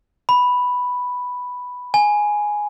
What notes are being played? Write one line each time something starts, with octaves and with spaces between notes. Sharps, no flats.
B5
G#5